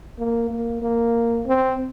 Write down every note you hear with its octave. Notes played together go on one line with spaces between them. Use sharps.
A#3
A#3
A#3
C4